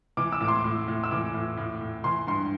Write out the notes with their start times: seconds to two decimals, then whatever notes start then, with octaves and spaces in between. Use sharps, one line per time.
0.17 E3 D6
0.32 E6
0.40 A2 D6
0.48 C6
0.64 A2
0.88 A2
1.04 E6
1.11 E3 D6
1.34 A2
1.57 A2
1.81 A2
2.04 E3 C6
2.27 G2 C6